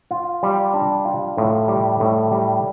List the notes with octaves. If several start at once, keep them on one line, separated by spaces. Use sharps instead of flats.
F4
G3
D4
F4
A2
G3
A2
G3